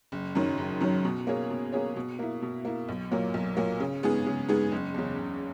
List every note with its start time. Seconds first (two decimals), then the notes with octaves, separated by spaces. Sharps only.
0.12 F#1
0.35 F#2 D#3 F#3
0.58 F#1
0.81 F#2 D#3 F#3
1.04 B2
1.27 A#3 C#4 G#4 C#5
1.50 B2
1.72 A#3 C#4 G#4 C#5
1.96 B2
2.19 A#3 E4
2.42 B2
2.65 A#3 E4
2.89 B1
3.11 A#2 F#3 A#3
3.34 B1
3.57 A#2 F#3 A#3
3.80 C#3
4.03 G#3 B3 D#4 G#4
4.26 C#3
4.49 G#3 B3 D#4 G#4
4.72 F#1
4.94 E2 C#3
5.18 F#1